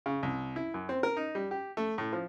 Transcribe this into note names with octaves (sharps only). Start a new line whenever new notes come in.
C#3
C2
E4
F#2
C4
A#4
D#4
G3
G4
A3
A2
F3